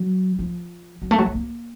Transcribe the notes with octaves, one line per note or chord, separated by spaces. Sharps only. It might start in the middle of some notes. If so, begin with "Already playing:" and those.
Already playing: F#3
F3
F#3
A3
F#3
A3
A#3